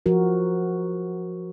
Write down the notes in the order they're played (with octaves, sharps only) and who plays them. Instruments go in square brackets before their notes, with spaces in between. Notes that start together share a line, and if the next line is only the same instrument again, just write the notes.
[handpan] F3 F#4 A#4